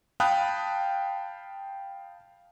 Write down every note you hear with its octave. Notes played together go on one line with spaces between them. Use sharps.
F5 G5 A5 B5 D#6 F#6